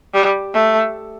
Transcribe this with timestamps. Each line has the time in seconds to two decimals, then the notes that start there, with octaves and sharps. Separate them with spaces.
0.14 G3
0.54 A3